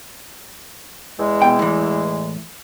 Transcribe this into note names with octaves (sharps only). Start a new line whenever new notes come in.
E2 G#3
B2 G5
A2 E3